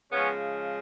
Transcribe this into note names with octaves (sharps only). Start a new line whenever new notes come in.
C#3 F3 G#3 B3 C#4